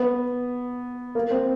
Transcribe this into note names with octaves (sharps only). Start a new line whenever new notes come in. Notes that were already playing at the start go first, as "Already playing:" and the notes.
Already playing: B3
A#3
C4